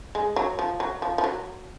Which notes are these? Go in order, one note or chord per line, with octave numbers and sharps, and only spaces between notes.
G#3
F#3
F3
F#3
F3
F3
F#3